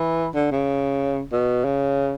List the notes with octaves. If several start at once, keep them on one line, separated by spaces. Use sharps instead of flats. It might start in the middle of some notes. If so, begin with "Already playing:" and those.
Already playing: E3
D3
C#3
B2
C#3